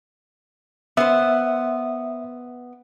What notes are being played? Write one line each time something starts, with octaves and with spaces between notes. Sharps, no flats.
B3 C5 E5